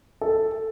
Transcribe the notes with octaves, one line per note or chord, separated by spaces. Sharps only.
A4